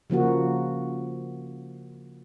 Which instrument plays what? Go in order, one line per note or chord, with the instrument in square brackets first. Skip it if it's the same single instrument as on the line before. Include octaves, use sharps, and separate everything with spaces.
[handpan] C#3 F3 A#3 F#4